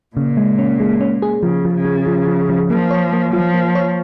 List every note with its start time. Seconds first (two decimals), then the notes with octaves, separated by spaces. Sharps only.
0.17 A#2 C#3
0.37 G#3
0.58 C#4
0.80 G#3
1.01 C#4
1.22 G#4
1.43 C#3 F3
1.65 F3
1.74 C#3
1.85 F3
2.07 F3
2.27 F3
2.49 F3
2.70 F3 A#3
2.91 C#5
3.13 A#3
3.33 F3 F4
3.54 A#3
3.75 C#5